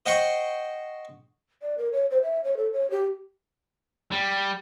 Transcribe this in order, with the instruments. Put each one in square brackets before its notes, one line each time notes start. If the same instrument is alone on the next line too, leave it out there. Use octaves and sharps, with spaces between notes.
[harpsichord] C5 D#5 F#5 G5 C6 C#6
[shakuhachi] D5
A#4
C#5
C5
E5
C#5
A4
C#5
G4
[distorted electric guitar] G3